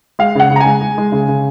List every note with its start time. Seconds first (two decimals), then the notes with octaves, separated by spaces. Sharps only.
0.19 G#3 F5
0.35 C#3 F#5
0.51 C#3
0.56 A#5
0.60 G#5
0.66 G#3
0.81 G#3
0.98 G#3
1.12 C#3
1.28 C#3